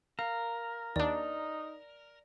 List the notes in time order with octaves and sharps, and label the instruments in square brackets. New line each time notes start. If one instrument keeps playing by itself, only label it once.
[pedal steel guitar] A#4 [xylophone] F5
[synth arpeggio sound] D#2 D4 [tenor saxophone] D#4 [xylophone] D5